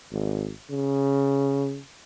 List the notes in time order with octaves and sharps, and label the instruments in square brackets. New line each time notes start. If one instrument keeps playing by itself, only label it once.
[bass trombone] G#1
C#3